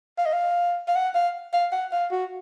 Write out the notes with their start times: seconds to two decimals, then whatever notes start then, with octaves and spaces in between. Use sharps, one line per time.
0.18 F5
0.26 D#5
0.33 F5
0.88 F5
0.96 F#5
1.15 F5
1.53 F5
1.72 F#5
1.93 F5
2.11 F#4